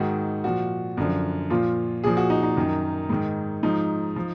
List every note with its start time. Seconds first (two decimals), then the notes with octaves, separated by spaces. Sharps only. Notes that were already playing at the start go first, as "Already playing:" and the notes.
Already playing: G#2 D#3 F#4
0.44 A#2 F3 F#4
0.97 F#2 D3 F3
1.50 A#2 F3 F4
2.04 A#2 F3 G#4
2.17 F#4
2.30 D#4
2.43 D#4
2.57 F#2 D#3
3.09 G#2 D#3
3.63 G#2 F3 D#4
4.16 F3